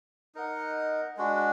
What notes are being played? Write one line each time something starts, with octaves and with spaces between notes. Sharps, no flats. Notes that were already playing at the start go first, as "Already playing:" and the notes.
D#4 A#4 D#5 F#5
G#3 D4 F#4